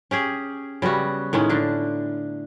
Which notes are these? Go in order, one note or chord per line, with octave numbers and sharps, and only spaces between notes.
C#4 G4 G#4
C#3 G3 B3 F#4
A2 D#3 G#3 C#4
D3 D4